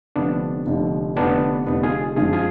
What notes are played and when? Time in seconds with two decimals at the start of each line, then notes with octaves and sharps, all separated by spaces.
0.16 F1 F2 D3 B3 D4
0.66 F1 F2 D3
1.16 F1 F2 D3 B3 D4
1.66 F1 F2 D3 B3 D4
1.83 F4 G#4
2.16 F#2 F3 G#3 D4 F4 G#4
2.33 F4 G#4